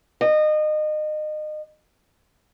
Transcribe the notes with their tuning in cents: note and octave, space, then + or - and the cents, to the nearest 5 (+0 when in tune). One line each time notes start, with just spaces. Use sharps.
D#5 -30